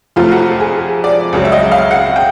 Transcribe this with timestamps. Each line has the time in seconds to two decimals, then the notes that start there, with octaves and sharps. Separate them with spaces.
0.16 F2 C3 F3 A3 F4
0.31 F#4
0.60 G#4
1.04 D5
1.33 C#2 C#3 F#3
1.45 E5
1.52 D#5
1.71 F5
1.91 F#5
2.16 G5